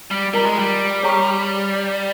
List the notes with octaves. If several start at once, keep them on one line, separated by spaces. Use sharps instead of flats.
G3
G3 F4 A#4 D#5 A#5
G#3
G3
G#4 C#5 G5 A#5 C#6